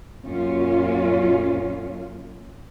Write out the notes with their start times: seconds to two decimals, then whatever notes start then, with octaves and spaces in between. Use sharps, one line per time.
0.24 F#2 A#2 C#4 F4